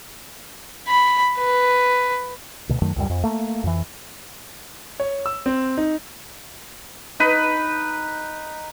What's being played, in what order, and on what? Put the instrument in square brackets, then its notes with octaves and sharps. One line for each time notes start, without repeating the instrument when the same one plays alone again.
[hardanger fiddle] B5
B4
[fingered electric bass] D2 B2
F#2 D#3 F#3 A3
C#2 F#2 G3
F2
A3 A#3
F2 E3
[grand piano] C#5
E6
C4
D#4
[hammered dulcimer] D#4 B4